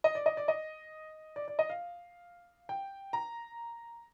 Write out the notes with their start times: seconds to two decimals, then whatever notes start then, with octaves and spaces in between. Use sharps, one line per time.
0.04 D#5
0.15 D5
0.26 D#5
0.37 D5
0.48 D#5
1.36 D5
1.48 D5
1.59 D#5
1.70 F5
2.69 G5
3.13 A#5